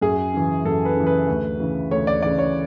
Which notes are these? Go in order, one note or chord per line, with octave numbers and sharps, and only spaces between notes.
F#2 G#4
C#3 E3
F#2 A4
B4
C#3 E3
B4
D2
C#3 E3
D2 C#5
D5
C#3 E3 D5
C#5